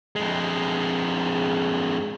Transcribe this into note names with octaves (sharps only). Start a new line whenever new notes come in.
F2 G#3